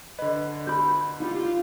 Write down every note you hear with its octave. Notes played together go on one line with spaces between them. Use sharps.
D3 B4 D#5
F#4 B5 G6
D#4 F4 G4